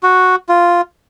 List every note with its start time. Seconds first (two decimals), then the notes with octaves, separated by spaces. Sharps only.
0.03 F#4
0.49 F4